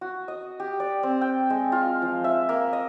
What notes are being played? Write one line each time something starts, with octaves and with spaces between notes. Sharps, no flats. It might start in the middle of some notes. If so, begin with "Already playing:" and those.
F#4
D#5
G4
D5
C4
G5
G#3
F4
F3
E5
A#3
D#5